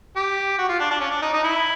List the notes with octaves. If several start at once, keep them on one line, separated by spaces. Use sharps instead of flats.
G4
F#4
F4
D4
D4
C#4
D4
D#4
D#4
E4